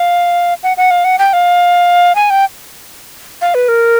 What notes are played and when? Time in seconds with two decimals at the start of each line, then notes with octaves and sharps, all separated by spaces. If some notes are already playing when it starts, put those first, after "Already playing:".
Already playing: F5
0.63 F#5
0.77 F#5
0.91 F5
1.05 F#5
1.19 G5
1.33 F5
2.15 G#5
2.30 G5
3.42 F5
3.55 B4
3.68 A#4